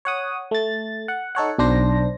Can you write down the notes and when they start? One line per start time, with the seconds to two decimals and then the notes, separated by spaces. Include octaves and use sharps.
0.05 C#5 F#5 D#6
0.51 A3 A6
1.08 F#5
1.35 D#4 A4 C#5 F#5
1.58 B1 D4 C5 A#6